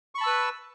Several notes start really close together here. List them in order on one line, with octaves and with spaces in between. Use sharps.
C#6 B5 A5 E6 B4